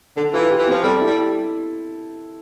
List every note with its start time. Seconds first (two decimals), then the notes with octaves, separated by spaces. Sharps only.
0.17 D3 A4
0.34 E3 F4
0.50 G4
0.59 E3
0.67 F3 C4
0.84 G3 A4
1.01 E4
1.07 G3